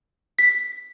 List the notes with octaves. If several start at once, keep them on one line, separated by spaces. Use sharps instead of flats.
B6